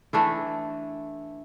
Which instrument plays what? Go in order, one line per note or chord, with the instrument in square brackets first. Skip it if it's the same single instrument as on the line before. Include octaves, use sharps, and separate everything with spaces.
[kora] E3 A3 D4 E4